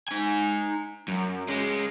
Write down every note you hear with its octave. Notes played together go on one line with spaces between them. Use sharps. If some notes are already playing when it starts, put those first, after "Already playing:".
D#4 G#5
F#2
G#3 C#4